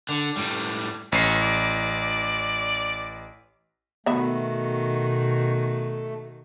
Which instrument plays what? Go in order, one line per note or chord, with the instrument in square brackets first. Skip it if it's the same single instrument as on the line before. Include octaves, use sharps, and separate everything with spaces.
[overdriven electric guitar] D3
A2 G3
[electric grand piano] A1 C7 [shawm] C#4
[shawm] D5
[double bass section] B2 [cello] D#3 F#4 [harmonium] A3 [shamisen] B3 E5